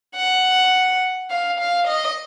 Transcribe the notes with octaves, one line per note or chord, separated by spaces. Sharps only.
F#5
F5
F5
D#5